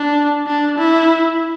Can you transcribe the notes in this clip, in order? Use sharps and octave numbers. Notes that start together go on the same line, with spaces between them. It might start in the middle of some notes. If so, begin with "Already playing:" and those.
Already playing: D4
D4
E4